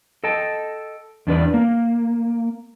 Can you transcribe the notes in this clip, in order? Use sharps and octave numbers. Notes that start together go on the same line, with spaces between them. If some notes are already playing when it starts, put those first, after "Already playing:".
A4 D#5 G5 A5
E2 D4 B4 D5
A#3